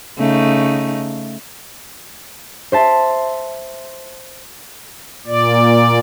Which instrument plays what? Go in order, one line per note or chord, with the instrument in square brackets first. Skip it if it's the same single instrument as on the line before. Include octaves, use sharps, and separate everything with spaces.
[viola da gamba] C#3 A3 D#4
[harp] C5 E5 A5
[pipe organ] A#2 D5